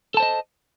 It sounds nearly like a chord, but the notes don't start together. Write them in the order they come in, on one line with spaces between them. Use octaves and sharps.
A4 A5 C5 D#5